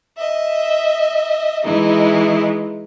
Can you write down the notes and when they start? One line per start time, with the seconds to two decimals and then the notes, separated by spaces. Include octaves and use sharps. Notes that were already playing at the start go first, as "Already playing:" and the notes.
0.17 D#5 E5
1.63 E3 G#3 D#4 E4